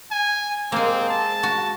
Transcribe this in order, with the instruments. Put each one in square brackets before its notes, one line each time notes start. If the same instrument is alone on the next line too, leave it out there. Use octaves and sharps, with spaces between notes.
[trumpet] G#5
[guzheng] G#3 A#3 [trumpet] C4
[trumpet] A5
[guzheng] F#4